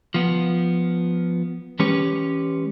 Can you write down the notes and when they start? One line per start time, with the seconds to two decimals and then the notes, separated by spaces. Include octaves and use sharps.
0.14 F3 B3
1.79 E3 G#3 C#4 G4 B4 C#5